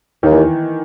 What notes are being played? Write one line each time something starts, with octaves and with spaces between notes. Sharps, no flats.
D#2 D#3
E3